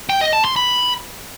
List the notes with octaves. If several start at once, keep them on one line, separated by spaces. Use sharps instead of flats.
G5
D#5
A5
C6
B5